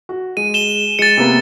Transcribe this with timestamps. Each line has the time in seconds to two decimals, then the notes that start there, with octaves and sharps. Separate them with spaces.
0.09 F#4
0.37 G#3 D#7
0.54 E7 G7
0.99 G#3 A6 C#7
1.17 C3 A#3 B3